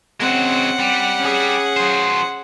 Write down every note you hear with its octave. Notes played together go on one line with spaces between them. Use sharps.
G#3 C4 C#4 F#4 F#5
G3
C#4 G#4
F#3 C5